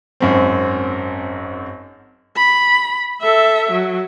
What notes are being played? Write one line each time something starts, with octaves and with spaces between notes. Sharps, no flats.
G#1 F#2 C4
B5
A4 E5
F#3